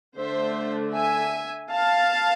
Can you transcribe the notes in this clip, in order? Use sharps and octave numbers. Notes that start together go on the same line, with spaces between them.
D3 A3 D4 C5 E5
E5 G#5
F5 A5